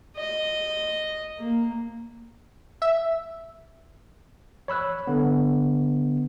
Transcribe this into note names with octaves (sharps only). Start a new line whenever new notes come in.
D#5
A#3
E5
C#5 B5 E6 F#6
D3 B3